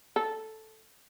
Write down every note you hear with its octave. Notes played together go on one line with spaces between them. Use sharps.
A4